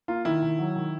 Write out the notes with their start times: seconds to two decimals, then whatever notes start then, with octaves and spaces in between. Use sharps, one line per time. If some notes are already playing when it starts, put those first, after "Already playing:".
0.08 A#3 F4
0.25 D#3 E4
0.43 D#3
0.59 F#3
0.76 D#3